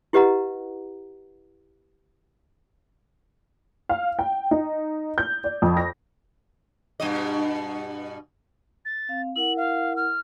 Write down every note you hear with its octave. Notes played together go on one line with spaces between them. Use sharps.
E4 G4 B4 D#5 F#5 A#5
F5
G5
D#4
G6
D5
F2
A#6
G2 B2 D#5
A6
C4 F5
E4 A#4 F#5 F#7
F5
F6